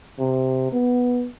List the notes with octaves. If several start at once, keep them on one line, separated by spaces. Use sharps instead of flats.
C3
B3